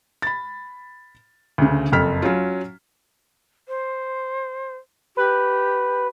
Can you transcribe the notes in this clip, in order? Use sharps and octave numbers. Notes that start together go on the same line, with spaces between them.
B5 A6
D2 C#3
F#1 F2 A4 F6 B6
F#3 C#4 F4
C5
G4 B4